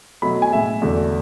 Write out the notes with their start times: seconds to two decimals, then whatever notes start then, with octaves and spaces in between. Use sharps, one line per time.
0.22 B2 F#3 A3 B5
0.42 G#5
0.52 A2 G#3 E5
0.82 E2 D3 F#3 A3